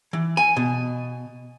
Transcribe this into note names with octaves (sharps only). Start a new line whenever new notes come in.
E3
G#5
B2